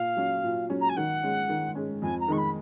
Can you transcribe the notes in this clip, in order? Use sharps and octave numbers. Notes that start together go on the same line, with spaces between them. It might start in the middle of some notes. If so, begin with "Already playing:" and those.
Already playing: A#2 F5
F#3 C#4
A#2
F#3 C#4
A#5
G#5
D#3 F#5
G#3 C#4
D#3
G#3 C#4
F2 G#5
A#5
D#3 G#3 D#4 C#6
B5